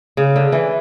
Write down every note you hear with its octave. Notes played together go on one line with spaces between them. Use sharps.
C#3
D3
E3